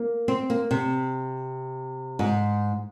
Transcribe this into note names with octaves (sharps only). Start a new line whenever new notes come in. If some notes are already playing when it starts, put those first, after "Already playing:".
Already playing: A#3
C4
A#3
C3
G#2